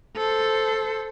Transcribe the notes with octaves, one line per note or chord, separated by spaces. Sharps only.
A4 C5